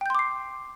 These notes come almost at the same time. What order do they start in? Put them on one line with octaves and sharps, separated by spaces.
G5 G6 C6 D6 C7